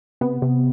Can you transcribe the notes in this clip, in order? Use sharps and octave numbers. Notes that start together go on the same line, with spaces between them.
C3 B3
C3